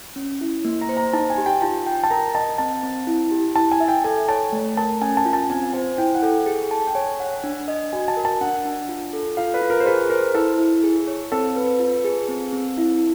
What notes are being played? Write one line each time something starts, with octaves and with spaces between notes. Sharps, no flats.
C#4
E4
A#3
A#5
C5
A#5
D#4 A5
G#5
G4
G5
F4 A5
G5
A5
A#4 A#5
D#5 A5
C4 A5
C4
E4
G4
E4 A5
G#5
E5
G5
A4 G#5
C#5 A5
A3
A#4 A5
C#4 G#5
A5
F4
A5
C4 G#5
C5 G#5
E4 G5
F#5
A4 G5
G#4
A5
G5
C#5 G#5
F#5
D4
D#5
F#4 G#5
A5
A#4
A5
D4 F#5
D4
F4
A4
F4 F5
B4
F4
A#4
C5
G#4 B4
A#4 C5
E4 A4
E4
G#4
C#5
C4 A4
B4
F4
G#4
C4
C4
E4